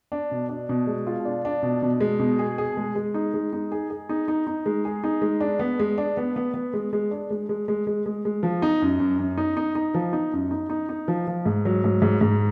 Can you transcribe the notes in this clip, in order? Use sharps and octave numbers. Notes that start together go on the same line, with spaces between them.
D4
B2
D4
B2
G#3
F4
D4
D4
B2
B2
G#3
B2
G#4
G#4
G#3
G#3
D#4
G#3
D#4
G#4
G#4
D#4
D#4
D#4
G#3
G#4
D#4
G#3
D4
B3
G#3
D4
B3
B3
B3
G#3
G#3
D4
G#3
G#3
G#3
G#3
G#3
G#3
F3
D#4
F#2
F#2
F#2
D#4
D#4
D#4
F3
D#4
F#2
D#4
D#4
D#4
F3
F3
G#2
F#3
G#2
G#2
G#2